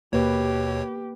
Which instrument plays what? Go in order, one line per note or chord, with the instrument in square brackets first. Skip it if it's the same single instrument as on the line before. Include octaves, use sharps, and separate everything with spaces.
[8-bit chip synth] D#2 B2 C#5 [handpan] A#3 B4 [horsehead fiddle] G4